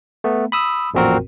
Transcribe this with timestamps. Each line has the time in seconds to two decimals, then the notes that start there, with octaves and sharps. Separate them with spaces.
0.24 A3 B3
0.52 B5 D#6 E6
0.94 A1 F2 A#2 C4 F#4 A#4